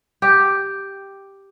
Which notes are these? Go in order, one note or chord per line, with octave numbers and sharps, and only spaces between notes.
G4